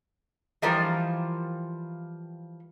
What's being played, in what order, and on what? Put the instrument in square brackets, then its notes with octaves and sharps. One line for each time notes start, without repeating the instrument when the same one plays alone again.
[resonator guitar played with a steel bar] E3 F3 G3 F4 A#4 C5